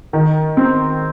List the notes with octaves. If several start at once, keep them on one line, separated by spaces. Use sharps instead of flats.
D#3
C4